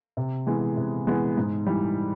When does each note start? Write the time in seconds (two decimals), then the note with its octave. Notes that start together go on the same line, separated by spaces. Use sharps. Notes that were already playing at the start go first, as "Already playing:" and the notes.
0.17 C3
0.47 E3 G#3 B3
0.77 C3
1.07 E3 G#3 B3
1.37 G#2
1.66 E3 G3